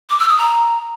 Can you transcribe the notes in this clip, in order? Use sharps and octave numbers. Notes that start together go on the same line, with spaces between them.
D6
E6
D#6
A#5